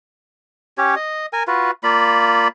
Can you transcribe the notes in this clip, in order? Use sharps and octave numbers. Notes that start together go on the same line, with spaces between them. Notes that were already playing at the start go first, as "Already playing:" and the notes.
C#4 G4 C#5
D#5
A#4 G#5
F4 F#4 B4
A#3 F4 D5 B5